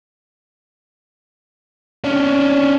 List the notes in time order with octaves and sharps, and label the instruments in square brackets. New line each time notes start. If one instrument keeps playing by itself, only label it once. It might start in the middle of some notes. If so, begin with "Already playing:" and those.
[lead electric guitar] C#4 D4